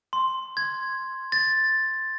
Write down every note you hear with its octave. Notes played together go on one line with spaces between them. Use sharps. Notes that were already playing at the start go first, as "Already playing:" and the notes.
C6
G#6
A6